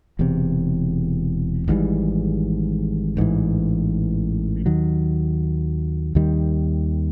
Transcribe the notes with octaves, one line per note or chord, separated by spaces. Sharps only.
E1 E2 C3
G#1 G#2 E3 G3
A1 G#2 E3
D#2 D#3 F#3
D#2 D#3 G3